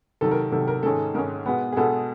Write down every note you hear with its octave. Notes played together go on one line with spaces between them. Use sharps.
C3 D#3 F#3 A4
A#4
C3 D#3 F#3 A4
A#4
G#2 D#3 G#3 C#4 A4
G#2 D#3 G#3 C#4 A#4
B2 G#3 B3
G#4
B2 G#3 B3 A4